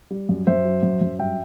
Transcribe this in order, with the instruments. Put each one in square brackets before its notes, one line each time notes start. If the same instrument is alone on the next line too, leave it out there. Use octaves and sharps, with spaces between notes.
[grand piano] G3
F#2
F#2 C5 E5
F#3
F#2
F#2
G2 E5 G5